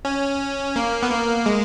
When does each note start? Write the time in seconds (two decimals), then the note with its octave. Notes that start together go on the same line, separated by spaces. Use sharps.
0.05 C#4
0.76 A#3
1.03 B3
1.11 A#3
1.46 G#3